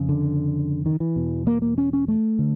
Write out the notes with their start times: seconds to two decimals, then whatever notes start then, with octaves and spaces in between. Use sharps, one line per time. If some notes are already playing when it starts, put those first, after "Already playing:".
Already playing: F2 C#3
0.09 D3
0.86 D#3
1.00 E3
1.16 E2 B2
1.47 A#3
1.62 A#3
1.78 C#4
1.93 C#4
2.08 A3
2.39 D3